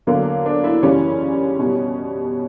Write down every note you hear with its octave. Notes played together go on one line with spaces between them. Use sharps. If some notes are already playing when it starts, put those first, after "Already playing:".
E2 D3 F#3 A#3
D4
E4
F#2 C#3 E3 G3 C#4
B2 G3